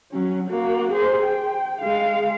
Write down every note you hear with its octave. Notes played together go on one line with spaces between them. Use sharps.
F#3 C#4
A#3 F#4
G#4 C5
G5
G#3 F5